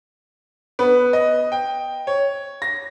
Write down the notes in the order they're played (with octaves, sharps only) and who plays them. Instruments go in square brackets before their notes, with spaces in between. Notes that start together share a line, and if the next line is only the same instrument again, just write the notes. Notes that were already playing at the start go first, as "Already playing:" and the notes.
[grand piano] B3
D#5
G5
C#5
A#6